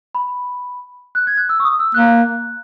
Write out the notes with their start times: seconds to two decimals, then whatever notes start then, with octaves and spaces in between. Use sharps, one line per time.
0.15 B5
1.15 F#6
1.27 G#6
1.37 F#6
1.49 E6
1.60 C#6
1.64 D#6
1.79 E6
1.94 A#3 F#6